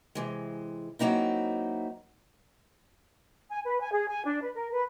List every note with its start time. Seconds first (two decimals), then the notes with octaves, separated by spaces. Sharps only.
0.15 C3 E3 G#3
0.99 F#3 A#3 C4 D#4 E4
3.50 G#5
3.65 B4
3.81 G#5
3.93 G#4
4.09 G#5
4.25 D4
4.42 B4
4.54 A#4
4.72 B4